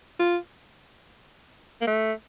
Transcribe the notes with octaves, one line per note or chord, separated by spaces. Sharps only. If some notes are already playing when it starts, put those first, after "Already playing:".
F4
A#3
A3